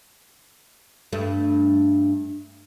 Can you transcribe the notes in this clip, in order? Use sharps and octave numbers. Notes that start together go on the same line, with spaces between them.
G2 A3